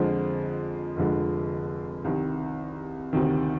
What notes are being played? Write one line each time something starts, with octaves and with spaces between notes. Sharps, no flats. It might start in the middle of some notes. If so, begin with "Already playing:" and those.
Already playing: F2 D3 F3 G#3
F1 F2 D3 G#3
C2 C3 D#3
D2 C3 D#3